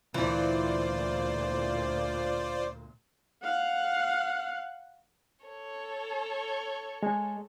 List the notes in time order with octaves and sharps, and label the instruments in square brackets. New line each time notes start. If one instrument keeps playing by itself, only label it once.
[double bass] D2 A#2 [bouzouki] E3 [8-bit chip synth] F4 C5 D5
[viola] F5 F#5
[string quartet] A4 C#5
[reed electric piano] G#3